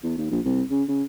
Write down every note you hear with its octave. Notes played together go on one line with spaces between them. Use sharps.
E2
D#2
A#1
C2
C#3
C#3